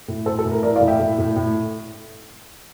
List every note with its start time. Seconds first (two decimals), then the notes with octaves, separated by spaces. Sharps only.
0.08 A2
0.25 A2 A4 C5
0.39 A4
0.45 A2
0.51 A#4
0.63 E3 A#4 D5
0.76 D5 F5
0.81 A2
0.88 E5 G5
0.99 A2
1.18 A2
1.36 A2